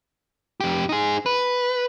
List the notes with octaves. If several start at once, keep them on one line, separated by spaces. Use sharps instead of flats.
F2 G4
D#4 G#4
B4